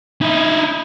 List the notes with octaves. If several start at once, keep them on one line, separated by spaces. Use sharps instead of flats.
D#4 E4